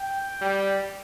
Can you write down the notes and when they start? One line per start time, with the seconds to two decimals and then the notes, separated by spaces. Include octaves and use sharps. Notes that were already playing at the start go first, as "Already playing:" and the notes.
Already playing: G5
0.41 G3